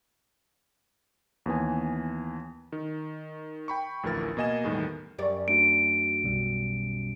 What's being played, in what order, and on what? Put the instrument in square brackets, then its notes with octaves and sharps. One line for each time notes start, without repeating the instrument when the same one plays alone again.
[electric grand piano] D#2 E3 B3 G#5
D#3
G5 B5 C#6
A1 D2 E3 F3 A#4 A6
B2 A#3 D#5 G#5 E7
E2 A2 D#3 G3
[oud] F#2 D5 [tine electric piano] G4 A#4 C#6
[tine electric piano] A3 D4 F#4 [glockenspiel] D7
[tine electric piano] B1 B2 G3